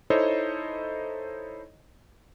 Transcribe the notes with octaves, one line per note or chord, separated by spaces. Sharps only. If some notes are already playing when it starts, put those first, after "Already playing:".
D#4 E4 A4 C5 C#5 D#5